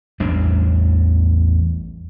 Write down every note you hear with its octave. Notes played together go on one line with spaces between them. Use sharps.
A1 E2 G3 D4